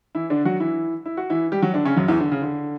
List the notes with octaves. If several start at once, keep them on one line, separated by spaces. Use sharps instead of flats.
E3 E4
D3 D4
F#3 F#4
E3 E4
E4
F#4
E3 E4
G3 G4
F#3 F#4
D3 D4
C#3 C#4
F#2 F#3
E2 E3
D3
C#3
D3